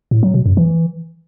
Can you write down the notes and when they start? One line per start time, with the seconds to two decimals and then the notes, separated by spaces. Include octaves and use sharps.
0.11 A2
0.23 F#3
0.34 B2
0.46 F#2
0.57 E3